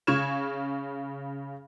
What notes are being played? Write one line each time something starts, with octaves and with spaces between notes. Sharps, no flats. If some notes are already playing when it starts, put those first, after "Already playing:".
C#3 C#6 F6 G#6 E7